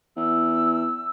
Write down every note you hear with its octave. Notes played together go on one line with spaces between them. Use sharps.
E2 E6